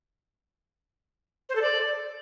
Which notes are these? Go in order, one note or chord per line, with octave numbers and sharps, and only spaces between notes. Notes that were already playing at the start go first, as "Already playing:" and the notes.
C5
A4
D5